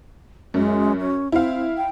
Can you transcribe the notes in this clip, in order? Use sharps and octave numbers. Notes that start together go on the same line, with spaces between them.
F#2 G#3
C#4
C4 E4 F5
G5